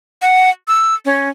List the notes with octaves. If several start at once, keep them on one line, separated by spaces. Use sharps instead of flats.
F#5
E6
C#4